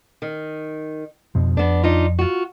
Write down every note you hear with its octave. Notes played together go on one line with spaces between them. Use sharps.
D#3
F2 B2 F3
F2 B3 D4
D4 D#4 F4
F4 F#4